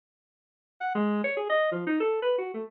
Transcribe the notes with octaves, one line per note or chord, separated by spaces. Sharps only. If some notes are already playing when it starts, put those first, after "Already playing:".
F#5
G#3
C#5
G#4
D#5
F3
D#4
A4
B4
F#4
A3